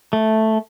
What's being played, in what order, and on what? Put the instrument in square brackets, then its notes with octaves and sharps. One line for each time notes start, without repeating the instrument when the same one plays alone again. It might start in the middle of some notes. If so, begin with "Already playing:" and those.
[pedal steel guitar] A3